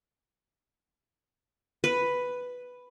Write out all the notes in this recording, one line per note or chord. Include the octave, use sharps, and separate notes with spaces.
B4